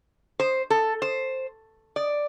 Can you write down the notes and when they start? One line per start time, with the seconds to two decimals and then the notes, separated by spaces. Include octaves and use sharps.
0.40 C5
0.70 A4
1.02 C5
1.96 D5